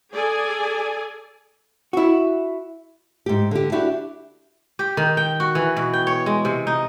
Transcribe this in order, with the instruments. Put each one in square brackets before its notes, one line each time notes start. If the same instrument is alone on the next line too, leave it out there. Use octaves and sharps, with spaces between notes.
[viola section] G#4 A4 D5 G#5
[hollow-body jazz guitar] E4 F#4
[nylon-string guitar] G#2 G4
D3 G4
D4 E4 F#4 G4
[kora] G4
D#3
G5
F#4
E3
B2
G5
C#5
G#3
C3
D#4